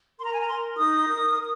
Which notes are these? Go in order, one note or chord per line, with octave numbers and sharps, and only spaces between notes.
A#4 C6
A#5
G#5
A#5
A#4 C6
D#4 D#6
A#4
A#4